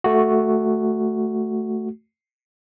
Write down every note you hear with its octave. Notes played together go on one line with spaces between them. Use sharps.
A3 F#4